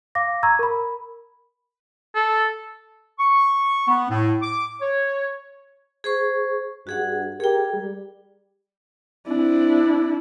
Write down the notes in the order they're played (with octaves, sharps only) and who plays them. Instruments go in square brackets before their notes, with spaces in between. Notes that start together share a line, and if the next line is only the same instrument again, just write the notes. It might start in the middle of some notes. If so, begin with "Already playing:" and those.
[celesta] F5 D6 A#6
A#5 C#6 E6 G#6
A#4 B5
[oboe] A4
[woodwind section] C#6
B3
A2
D6
C#5
[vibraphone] G#4 C5 C#6
[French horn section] G2 [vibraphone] F#4 G#4 F#5
[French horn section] G4 A#4 [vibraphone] G#4 G5
[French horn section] G3
[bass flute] C4 [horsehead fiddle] D4 E4